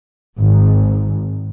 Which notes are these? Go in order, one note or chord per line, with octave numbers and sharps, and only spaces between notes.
G#1